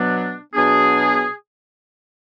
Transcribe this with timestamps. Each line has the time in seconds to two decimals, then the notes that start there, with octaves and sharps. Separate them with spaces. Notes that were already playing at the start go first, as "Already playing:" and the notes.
Already playing: B2 F#3 B3 D4
0.54 B2 F#3 B3 D4 G#4